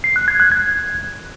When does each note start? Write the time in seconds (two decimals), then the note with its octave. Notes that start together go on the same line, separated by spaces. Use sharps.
0.04 C7
0.16 F#6
0.28 G#6
0.40 F#6
0.52 G#6